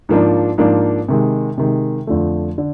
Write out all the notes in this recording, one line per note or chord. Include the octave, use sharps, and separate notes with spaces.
G#2 F3 A#3 D4
G#2 F3 A#3 D4
C3 D#3 G#3
C3 D#3 G#3
F2 D3 F3 A3
D3